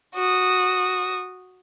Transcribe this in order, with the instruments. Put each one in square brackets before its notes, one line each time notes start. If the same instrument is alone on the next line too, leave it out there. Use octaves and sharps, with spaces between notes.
[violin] F#4 D#6